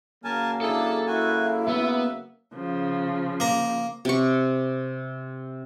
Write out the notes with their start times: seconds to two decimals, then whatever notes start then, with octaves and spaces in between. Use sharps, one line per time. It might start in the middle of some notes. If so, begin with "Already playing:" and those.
0.24 C#3 F#3 A#3 A#4 G#5 A5
0.61 D4 E4 G#4 A4 A5
1.07 E4 F#4 G#5
1.68 B3 E5
2.54 C#3 F3
3.40 A#3 A#5
4.05 C3 C#6